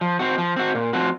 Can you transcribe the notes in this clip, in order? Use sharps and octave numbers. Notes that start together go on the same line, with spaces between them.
F3
C4 F#4
F3
C4 F#4
A#2
F3 C4 F#4